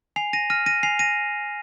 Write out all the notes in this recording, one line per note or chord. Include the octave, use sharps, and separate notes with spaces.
G#5 C7 F7
A#6 D#7
F6 A#6 D#7
A#6 D#7
G#5 C7 F7
A#6 D#7